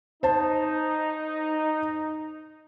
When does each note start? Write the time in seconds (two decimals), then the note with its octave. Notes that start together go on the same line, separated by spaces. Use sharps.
0.23 D#4 C5 A5